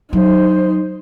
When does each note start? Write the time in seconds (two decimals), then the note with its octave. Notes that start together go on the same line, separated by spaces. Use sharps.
0.13 F#3 D#4 C5